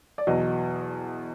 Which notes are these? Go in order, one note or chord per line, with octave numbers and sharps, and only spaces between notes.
D5
E2 B2 F#3 D#5